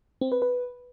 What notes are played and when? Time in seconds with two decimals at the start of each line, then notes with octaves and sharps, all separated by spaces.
0.21 C4
0.32 B4
0.42 B4